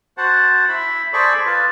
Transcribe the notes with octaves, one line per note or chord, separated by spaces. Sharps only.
F#4 C5 F#5 A5
E4 E5 B5
G#4 A4 C5 D5 B5 C#6
F4 B4 A5